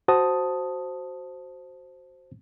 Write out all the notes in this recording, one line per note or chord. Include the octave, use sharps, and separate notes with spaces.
F#4 C5 A5 D#6